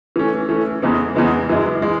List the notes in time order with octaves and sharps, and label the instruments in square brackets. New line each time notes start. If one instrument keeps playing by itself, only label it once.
[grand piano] E3 A3 C#4
E3 A3 C#4
E2 C#3 E3 G#3 B3
E2 C#3 E3 G#3 B3
F#2 E3 G#3
E3 G#3